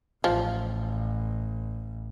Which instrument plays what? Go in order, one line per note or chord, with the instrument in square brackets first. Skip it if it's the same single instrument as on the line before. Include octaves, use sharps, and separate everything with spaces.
[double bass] A1 [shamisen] F3